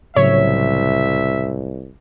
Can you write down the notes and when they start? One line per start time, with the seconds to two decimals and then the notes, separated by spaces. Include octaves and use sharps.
0.16 C2 A2 C#3 F#3 C#5 E5